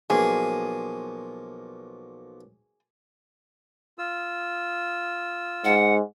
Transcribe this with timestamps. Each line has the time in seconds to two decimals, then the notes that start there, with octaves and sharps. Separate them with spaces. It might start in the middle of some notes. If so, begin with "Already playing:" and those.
0.10 B1 F3 A#3 G#4
3.98 F4 E6
5.65 G#2 F#5